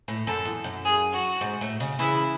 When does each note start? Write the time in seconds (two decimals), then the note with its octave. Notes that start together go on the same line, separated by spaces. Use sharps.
0.08 A2
0.27 F#2 A4
0.45 E2
0.64 F#2
0.84 G#4
1.13 F#4
1.41 G#2
1.61 A2
1.80 C#3
1.99 C#3 E3 E4